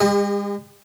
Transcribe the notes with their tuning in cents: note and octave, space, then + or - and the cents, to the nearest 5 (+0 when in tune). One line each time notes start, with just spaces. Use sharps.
G#3 -40 G4 +35 D#5 -15